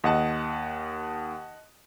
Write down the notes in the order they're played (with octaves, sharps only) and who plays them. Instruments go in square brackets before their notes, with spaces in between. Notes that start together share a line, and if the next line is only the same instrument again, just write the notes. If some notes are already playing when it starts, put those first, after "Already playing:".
[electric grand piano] D#2 [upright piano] D#5 F#5 A5